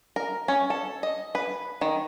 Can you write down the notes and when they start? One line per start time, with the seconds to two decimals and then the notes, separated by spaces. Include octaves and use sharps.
0.16 A#4
0.48 C#4
0.70 A4
1.03 D#5
1.35 B4
1.81 D#3